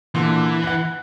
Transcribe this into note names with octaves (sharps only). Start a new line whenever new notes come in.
A#2 D3 E3
F#5 F#6